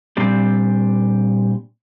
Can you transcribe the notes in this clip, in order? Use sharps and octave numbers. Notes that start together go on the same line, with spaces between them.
A#2 G3 C4 D4 G4